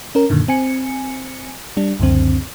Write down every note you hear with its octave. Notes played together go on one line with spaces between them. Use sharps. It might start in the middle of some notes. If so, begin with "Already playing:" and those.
C#4 A#4
F#2 A#2 D3 D#3
C4 G#5 C#7
G3 D4
C#2 F#2 D3 C4